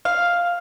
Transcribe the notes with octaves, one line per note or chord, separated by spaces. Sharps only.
F5